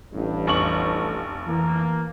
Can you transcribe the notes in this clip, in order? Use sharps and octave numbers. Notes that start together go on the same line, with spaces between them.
A1 G2
F1 C#6 F#7
E3 A#3